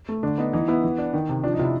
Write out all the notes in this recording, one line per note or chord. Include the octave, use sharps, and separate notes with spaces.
A3
D3 D4
B3 D#4
E3 D#4
B3 E4
E3
D4
D#3
C3
F3 D4
D#4
C3 E4 F4